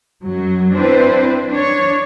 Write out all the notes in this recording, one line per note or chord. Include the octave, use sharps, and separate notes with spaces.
F#2 F#3
C4 D4 E4 B4 C5
D4 C#5